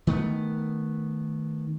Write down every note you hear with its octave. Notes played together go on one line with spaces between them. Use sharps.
D#3 A3 B3